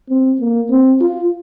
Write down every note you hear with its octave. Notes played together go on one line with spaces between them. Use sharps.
C4
A#3
C4
F4